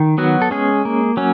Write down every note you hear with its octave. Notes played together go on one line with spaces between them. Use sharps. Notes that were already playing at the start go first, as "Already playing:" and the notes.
Already playing: D#3
F#3 B3 F#4
A4
G#3 C#4 G#4
A#3
F#3 C#4